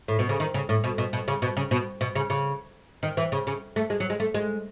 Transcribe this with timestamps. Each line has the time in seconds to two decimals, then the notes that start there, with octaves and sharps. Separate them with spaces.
0.08 A2
0.19 B2
0.29 C#3
0.40 D#3
0.54 C#3
0.69 A2
0.84 B2
0.98 B2
1.13 B2
1.28 C#3
1.42 B2
1.57 C#3
1.71 B2
2.01 B2
2.15 C#3
2.30 C#3
3.03 D#3
3.17 E3
3.32 C#3
3.47 C#3
3.76 A3
3.90 G#3
4.00 F#3
4.10 G#3
4.20 A3
4.34 G#3